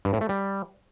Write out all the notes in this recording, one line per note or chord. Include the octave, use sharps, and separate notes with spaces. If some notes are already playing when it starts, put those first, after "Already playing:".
G2
A2
A3
G3